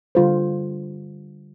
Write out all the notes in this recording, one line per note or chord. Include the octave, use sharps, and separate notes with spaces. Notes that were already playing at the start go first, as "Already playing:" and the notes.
D3 G3 F4 A4 C5